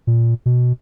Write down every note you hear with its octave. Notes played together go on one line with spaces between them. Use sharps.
A#2
B2